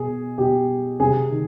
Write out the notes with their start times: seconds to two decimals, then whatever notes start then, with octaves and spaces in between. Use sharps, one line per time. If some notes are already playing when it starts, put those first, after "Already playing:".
Already playing: B2 G#4
0.38 B2 G4
1.00 C3 G#4
1.31 D#3